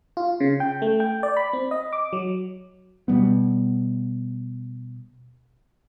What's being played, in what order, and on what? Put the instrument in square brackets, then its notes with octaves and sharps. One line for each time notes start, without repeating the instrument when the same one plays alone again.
[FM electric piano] F4
C#3
G5
A3
G5
D5
B5
C4
D#5
D6
F#3
[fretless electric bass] B2 G3 B3